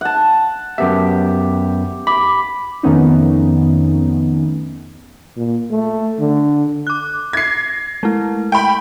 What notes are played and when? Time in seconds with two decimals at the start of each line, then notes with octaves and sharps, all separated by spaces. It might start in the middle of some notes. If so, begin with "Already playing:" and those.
0.01 F#5 A5
0.78 F#2 B3 G4 E5
2.07 B5 D6
2.83 F2 D#3 A3 B3 C#4 D#4
5.37 A#2
5.71 A3
6.20 D3
6.87 D6 F#6
7.33 G#6 A#6 C7
8.03 G#3 A3 E4
8.52 G5 B5